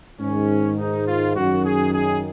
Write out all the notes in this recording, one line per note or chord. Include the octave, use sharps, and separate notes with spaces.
G#2 D#3 C#4
D#4
F4
F#2 D#3 F#4
G#4
G#4